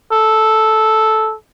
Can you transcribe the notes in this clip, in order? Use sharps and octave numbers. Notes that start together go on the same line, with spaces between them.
A4